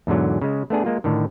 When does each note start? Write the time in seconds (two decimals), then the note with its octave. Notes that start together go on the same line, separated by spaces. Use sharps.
0.07 E2 G#2 D3 F#3
0.42 C#3 G#3
0.70 A3 B3 D4 G#4
0.85 G#3 A#3 F4
1.04 A2 D3 D#3